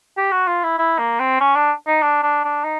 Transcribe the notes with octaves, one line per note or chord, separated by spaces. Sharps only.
G4
F#4
F4
E4
E4
A#3
C4
C#4
D4
D#4
D4
D4
D4
D#4